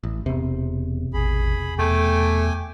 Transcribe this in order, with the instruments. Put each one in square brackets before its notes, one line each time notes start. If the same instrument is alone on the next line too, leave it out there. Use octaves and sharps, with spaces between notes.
[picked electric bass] A1
[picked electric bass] E1 C3 [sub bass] E2
[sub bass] A1 [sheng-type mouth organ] G#4 B5
[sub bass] E2 [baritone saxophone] A3 [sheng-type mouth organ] G5 G#5 D6